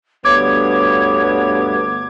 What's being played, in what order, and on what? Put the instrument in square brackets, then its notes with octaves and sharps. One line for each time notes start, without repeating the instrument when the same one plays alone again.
[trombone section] D2 G2 B3 [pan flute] C#5 [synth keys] D6 G#6